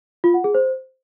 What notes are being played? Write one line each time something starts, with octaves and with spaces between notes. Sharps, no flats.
F4
F#5
G#4
C5